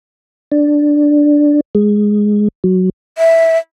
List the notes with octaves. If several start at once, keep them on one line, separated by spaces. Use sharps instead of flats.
D4
G#3
F#3
E5